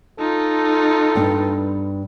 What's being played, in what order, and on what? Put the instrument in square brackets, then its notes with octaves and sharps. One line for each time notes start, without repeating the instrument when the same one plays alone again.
[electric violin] D#4 F4 [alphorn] A4
[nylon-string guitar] G2 B3 D4